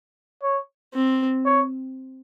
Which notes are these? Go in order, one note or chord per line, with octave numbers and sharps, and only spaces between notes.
C#5
C4
C#5